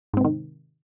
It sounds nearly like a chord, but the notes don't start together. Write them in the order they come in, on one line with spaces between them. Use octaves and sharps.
G#2 C4 C3 D#3